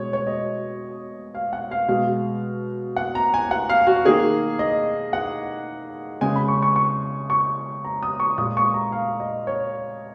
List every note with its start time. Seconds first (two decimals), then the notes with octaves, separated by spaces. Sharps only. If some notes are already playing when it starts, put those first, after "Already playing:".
Already playing: B2 G#3 C#5
0.13 C#5
0.27 D#5
1.35 F5
1.53 F#5
1.71 F5
1.88 B2 G#3 F5
2.96 F#5
3.15 A#5
3.34 G#5
3.51 F#5
3.69 F5
3.87 F#4
4.05 D#3 A#3 G#4
4.59 D#5
5.13 F#5
6.21 C#3 G#3 G#5
6.36 B5
6.48 C#6
6.62 C#6
6.76 C#6
7.30 C#6
7.84 A#5
8.03 D#6
8.20 C#6
8.38 A#2 G#3 D#6
8.57 C#6
8.74 A#5
8.92 F5
9.20 D#5
9.47 C#5